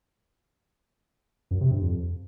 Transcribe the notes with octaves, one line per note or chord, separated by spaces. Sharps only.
F#2
C3
G2
F2